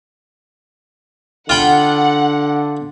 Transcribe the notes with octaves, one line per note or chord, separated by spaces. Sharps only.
D3 F4 F#5 G5 B5